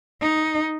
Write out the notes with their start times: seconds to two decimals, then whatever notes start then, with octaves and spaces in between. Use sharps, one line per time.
0.21 D#4